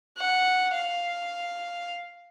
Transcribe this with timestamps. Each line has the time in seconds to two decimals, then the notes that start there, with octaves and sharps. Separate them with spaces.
0.17 F#5
0.74 F5